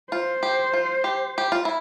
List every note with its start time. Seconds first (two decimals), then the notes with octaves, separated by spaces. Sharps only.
0.12 F4 C5
0.43 G4
0.73 F4
1.04 G4
1.38 G4
1.52 F4
1.65 E4